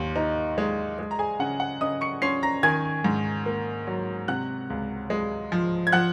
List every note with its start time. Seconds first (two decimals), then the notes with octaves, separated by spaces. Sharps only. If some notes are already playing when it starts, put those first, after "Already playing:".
Already playing: D#2 D#3 C6
0.16 D#4
0.58 G#3
0.99 G#3
1.11 A#5
1.19 G#4 G#5
1.39 C#3 F#5
1.60 F#5
1.81 C#3 D#5 D#6
2.01 C#6 C#7
2.22 C#4 C6 C7
2.43 A#5 A#6
2.63 D#3 G#5 G#6
3.04 G#2
3.46 A#3
3.87 F#3
4.28 C3 F#5 F#6
4.70 C#2
5.10 G#3
5.52 F3
5.87 G#6
5.92 F3 F#5 F#6